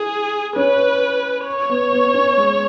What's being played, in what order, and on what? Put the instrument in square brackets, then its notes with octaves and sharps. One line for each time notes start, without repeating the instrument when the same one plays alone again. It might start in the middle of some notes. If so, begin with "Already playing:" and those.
Already playing: [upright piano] E4 [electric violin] G#4
[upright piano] C#4 [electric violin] B4
[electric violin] C#5
[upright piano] B3
B3
B3
C#4
G#3